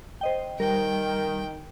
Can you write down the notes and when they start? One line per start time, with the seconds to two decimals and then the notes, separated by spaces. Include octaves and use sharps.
0.21 C5 D#5 G5
0.60 D#3 G3 A#4 G5